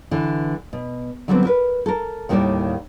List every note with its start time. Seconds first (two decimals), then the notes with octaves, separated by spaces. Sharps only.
0.11 D3 E3
0.73 B2
1.28 D3 F#3 G3 A3 B3 C4
1.45 A#4 B4
1.86 A4 A#4
2.29 D#2 A2 D#3 G3 A#4 D5